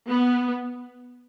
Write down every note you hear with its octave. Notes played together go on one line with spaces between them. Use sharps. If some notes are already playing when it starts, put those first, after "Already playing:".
B3